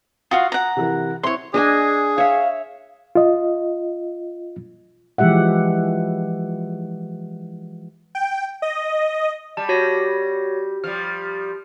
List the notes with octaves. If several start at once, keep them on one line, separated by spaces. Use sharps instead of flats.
F4 F#4 F5 D#6
F#5 A#5
C3 E3 A#4
C4 E4 C#5 C6
D4 G#4 D#5 G#5
C#5 E5 F5
F4 D#5
E3 F3 G#3 G4 E5 F#5
G5
D#5
G3 A5
F#4 C#5 A#6
F3 G3 F6